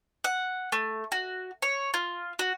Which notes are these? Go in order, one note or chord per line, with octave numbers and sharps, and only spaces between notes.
F#5
A3
F#4
C#5
F4
F#4